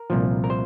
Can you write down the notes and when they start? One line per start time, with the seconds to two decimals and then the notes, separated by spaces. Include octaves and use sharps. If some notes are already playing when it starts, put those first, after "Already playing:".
Already playing: A#4
0.10 C2 A#2 F3
0.44 A#4
0.50 C5